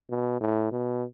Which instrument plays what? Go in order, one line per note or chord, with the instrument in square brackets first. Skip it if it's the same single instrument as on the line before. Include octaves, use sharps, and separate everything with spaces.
[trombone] B2
A2
B2